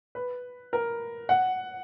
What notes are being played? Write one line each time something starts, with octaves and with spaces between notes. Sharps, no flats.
B4
A#4
F#5